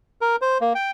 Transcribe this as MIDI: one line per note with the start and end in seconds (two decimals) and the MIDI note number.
0.21 0.36 70
0.41 0.58 72
0.61 0.73 58
0.75 0.91 79